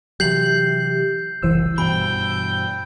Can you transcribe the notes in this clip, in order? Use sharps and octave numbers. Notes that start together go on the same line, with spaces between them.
C3 E3 F#3 G4 G6 C7 F#7
F#1 C2 E3 C5 E6
G2 B2 G5 B5